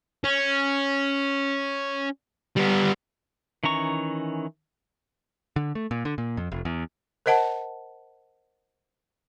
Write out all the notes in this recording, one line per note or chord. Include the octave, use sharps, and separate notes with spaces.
C#4
G3 B3
D#3 E3 C#4 A#5 C#6
D3
A3
A#2
D3
A#2
F2
F1
E2
A#4 C5 D#5 F#5 A5